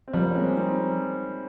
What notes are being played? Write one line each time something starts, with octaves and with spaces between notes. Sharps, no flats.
C4
F3 G3 A#3
C#4
G#3 C4
C4 D#4